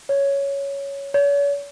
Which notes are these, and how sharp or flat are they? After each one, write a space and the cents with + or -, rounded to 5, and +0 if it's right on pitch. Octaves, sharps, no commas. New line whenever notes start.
C#5 +5
C#5 +40